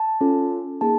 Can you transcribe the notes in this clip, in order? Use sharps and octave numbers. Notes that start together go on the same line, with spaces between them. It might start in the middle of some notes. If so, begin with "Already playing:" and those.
Already playing: A5
C#4 F4 A4
A#3 D#4 G#4 A5